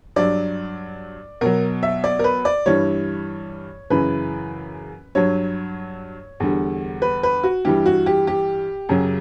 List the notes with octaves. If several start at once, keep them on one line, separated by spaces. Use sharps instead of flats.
G2 F#3 D5
B2 F#3 A#4
E5
D5
A#4
B4
D5
G2 E3 G3 C#5
F#2 C#3 E3 B4
G2 F#3 C#5
E2 D3 G3
B4
B4
F#4
G2 E3 G3 G4
F#4
G4
G4
F#2 C#3 F#3